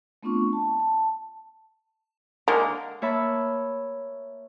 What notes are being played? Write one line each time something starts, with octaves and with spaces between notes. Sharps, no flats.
A3 B3 C4 D4 F4 C#6
A5
A5
D3 G#3 A#3 A#4
A#3 C#5 E5 A5 B5